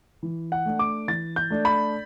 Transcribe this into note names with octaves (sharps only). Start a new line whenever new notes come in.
E3
F#5
A3 D4
D6
E3 A6
G6
A3 D4
B5